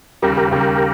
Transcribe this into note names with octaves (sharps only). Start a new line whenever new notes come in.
D#2 C#3 G3 G4 A#4
G4 A#4
D#2 C#3 G3 G4 A#4